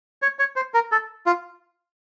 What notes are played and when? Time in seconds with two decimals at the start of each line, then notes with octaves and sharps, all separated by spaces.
0.22 C#5
0.39 C#5
0.56 C5
0.74 A#4
0.92 A4
1.26 F4